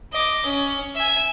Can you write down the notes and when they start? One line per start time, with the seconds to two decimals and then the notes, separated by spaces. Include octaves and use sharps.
0.13 D#5 D6
0.45 C#4
0.95 E5 G#5